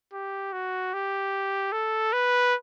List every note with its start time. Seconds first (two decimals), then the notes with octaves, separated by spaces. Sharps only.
0.13 G4
0.53 F#4
0.94 G4
1.72 A4
2.13 B4